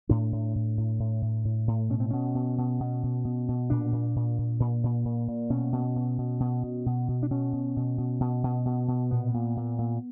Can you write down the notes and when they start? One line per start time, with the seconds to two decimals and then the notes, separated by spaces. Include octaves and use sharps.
0.09 A2 D4
0.32 A2
0.55 A2
0.77 A2
1.00 A2
1.22 A2
1.45 A2
1.67 A2
1.89 B2 C#4
2.00 C4
2.11 B2 C#4
2.35 B2
2.58 B2
2.80 B2
3.03 B2
3.25 B2
3.48 B2
3.70 A#2 D4
3.92 A#2
4.16 A#2
4.38 A#2
4.60 A#2
4.84 A#2
5.05 A#2
5.28 A#2
5.50 B2 C#4
5.73 B2
5.96 B2
6.18 B2
6.40 B2
6.63 B2
6.86 B2
7.08 B2
7.23 D4
7.31 B2 C#4
7.53 B2
7.77 B2
7.98 B2
8.20 B2
8.44 B2
8.65 B2
8.88 B2
9.11 A#2 B3
9.34 A#2
9.57 A#2
9.78 A#2